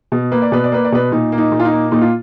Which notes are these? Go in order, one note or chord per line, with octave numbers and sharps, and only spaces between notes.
B2
A#3 B4
D5
B2 B4
D5
A#3 B4
D5
B2 B4
A#2 D#4
A#3
D#4
A#2
F4
D#4
A#3
A#2 D#4
F4